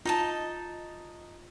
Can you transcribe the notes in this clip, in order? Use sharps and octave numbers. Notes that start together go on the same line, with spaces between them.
D#4 F4 D#5 A5